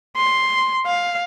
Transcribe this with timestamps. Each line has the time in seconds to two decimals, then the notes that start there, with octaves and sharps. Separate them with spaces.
0.17 C6
0.86 F5